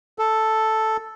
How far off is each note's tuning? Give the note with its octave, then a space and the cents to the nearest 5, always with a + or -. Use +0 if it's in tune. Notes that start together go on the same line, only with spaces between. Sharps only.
A4 +0